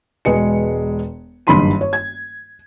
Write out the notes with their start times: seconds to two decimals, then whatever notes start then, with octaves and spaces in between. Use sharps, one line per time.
0.25 E1 G#3 B4 C#7
1.47 F#1 G2 D#3 B5 C6 D#7
1.81 C#5
1.93 G#6